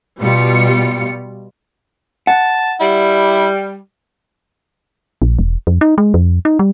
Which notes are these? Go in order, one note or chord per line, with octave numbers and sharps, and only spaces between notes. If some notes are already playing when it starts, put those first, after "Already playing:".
B2 G3 F4 C#7
F#5 A5
G3 E4
A#1
E1
F2
D#4
G#3
F2
D#4
G3